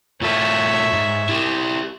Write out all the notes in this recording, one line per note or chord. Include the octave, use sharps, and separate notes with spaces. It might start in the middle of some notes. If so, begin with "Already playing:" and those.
A2 F4 A4 C#5 E5
G#2
E4 G4